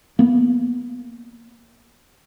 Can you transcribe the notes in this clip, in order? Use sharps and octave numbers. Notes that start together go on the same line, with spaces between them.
A#3 B3